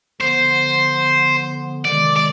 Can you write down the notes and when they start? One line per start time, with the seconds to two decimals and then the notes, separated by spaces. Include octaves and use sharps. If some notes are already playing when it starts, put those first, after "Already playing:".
0.21 D3 F3 B3 C5
1.85 C3 D#3 G#3 D5
2.17 D5